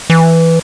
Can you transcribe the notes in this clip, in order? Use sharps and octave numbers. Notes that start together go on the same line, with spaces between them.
E3